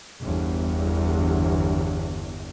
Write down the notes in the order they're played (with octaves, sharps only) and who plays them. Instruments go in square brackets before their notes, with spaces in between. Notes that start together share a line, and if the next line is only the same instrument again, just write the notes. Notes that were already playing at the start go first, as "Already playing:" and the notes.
[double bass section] G1 E2